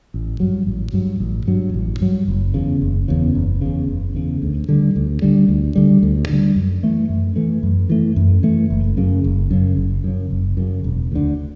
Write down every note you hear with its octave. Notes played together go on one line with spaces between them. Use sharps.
A1
G2 F#3
A1
G2 F#3
A1
G2 F#3
A1
G2 F#3
F#1
E2 C#3
F#1
E2 C#3
F#1
E2 C#3
F#1
E2 C#3
D2
D3 G3
D2
D3 G3
D2
D3 G3
D2
D3 G3
F#2
E3 A3
F#2
E3 A3
F#2
E3 A3
F#2
E3 A3
F#1
F#2 C#3
F#1
F#2 C#3
F#1
F#2 C#3
F#1
F#2 C#3
E1
D2 D3